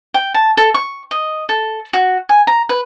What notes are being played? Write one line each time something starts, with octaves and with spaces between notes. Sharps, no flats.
G5
A5
A4
C#6
D#5
A4
F#4
G#5
A#5
B4